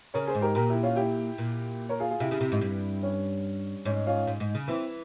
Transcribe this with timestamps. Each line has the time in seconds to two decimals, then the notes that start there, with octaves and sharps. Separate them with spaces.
0.14 C#3 A#4 C#5
0.27 G#4 C5
0.35 G#2
0.41 G4 A#4
0.55 A#2 G4 A#4
0.70 E4 G4
0.83 C#4 F4
0.96 E4 G4
1.38 A#2
1.89 A#4 C#5
2.00 F4 G#4
2.11 F4 G#4
2.20 C3 E4 G4
2.31 C#3
2.41 C3
2.52 G#2
2.61 G2
3.03 C#4
3.85 G#2 C#4
4.07 C#4 F4
4.27 G#2
4.40 G#2
4.55 C#3
4.68 E3 C4 E4